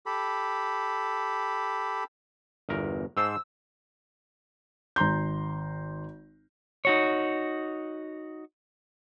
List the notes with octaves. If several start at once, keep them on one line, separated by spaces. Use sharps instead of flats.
G4 A4 B5
G1 E2 A#4
G#2 C5 A5 E6
G#1 A#5 C6 G6
D#4 F#4 C#5